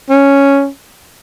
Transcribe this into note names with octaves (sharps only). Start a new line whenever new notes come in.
C#4